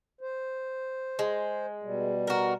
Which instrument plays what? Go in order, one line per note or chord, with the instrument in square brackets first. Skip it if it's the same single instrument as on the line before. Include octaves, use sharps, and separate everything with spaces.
[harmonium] C5
[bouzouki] G#3
[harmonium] B2 G3
[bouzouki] F#4 A#4